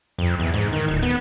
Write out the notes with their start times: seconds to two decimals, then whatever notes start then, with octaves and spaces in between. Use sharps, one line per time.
0.18 F2
0.39 E2
0.54 G#2
0.72 D#3
0.88 D1
1.03 B3